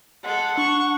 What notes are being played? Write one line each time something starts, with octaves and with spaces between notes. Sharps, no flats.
G#3 A4 F#5
D4 C#6